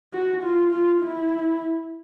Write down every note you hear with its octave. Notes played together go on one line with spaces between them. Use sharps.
F#4
F4
F4
E4